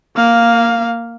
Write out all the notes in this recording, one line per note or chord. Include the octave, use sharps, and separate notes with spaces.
A#3 F5